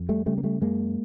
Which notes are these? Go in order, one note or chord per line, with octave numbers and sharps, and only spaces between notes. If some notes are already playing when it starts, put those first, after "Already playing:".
Already playing: F2
G3 A3
C#3 G3 A3
A#3
G3 A3
F#2 G#3 A#3